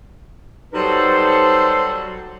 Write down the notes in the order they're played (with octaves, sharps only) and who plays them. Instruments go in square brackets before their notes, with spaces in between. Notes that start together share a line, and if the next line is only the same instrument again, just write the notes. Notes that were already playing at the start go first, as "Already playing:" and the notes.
[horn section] F#3 G3 A4 [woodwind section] D#4 B4 C5